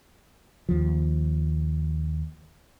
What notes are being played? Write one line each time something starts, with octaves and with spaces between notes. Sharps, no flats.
D#2 F3